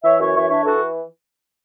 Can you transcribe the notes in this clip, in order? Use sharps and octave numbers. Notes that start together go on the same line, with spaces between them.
E3 C#5 E5
F#2 C#5 E5
E3 C#5 E5
D4 C#5 E5
E3 F#4 A4